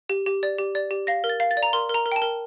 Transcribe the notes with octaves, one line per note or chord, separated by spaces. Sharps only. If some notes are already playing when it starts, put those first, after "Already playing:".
G4
G4
D5
G4
D5
G4
F5 A#6
A#4
A6
F5
A6
D5
A#5
A#4 C6
A#4 A#5
A#4
G5
A5
A#4